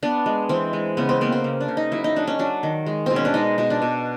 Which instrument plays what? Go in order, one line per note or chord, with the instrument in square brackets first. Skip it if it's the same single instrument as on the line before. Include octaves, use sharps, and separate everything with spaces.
[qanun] B3 D4
G#3
E3 C4
G#3
C#3 B3
C4
A#3 B3
C4
C#3
D4
C#3
D#4
F#3 E4
D#4
F#3 D4
C#4
F#3 D4
D#3
G#3
B2 C4
C#4
D4
G#3 D#4
B2 D#4
D4
B2